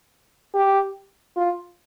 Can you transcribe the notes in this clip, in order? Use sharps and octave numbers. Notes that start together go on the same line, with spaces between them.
G4
F4